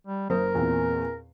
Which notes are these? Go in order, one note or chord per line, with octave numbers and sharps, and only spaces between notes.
G3
F#1 A#4 C5 D#6
E2 A#2 C4